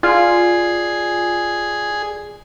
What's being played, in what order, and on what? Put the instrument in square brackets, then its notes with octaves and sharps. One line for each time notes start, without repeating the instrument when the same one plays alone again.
[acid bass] F4 [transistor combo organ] G#4 [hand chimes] D5 G#5 C7